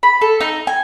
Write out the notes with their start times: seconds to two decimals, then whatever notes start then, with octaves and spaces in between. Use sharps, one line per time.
0.03 B5
0.21 A4
0.40 D#4
0.67 G#5